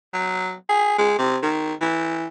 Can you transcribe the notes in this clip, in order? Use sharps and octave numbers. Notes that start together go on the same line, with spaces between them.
F#3
G#4
G#3
C3
D#3
E3